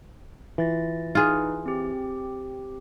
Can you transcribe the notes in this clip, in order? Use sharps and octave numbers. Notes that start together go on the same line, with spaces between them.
E3 F4 A6 A#6
D#4 F4 G#4 B4
C4 G4